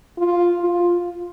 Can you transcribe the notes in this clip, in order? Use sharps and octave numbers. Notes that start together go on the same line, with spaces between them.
F4
F4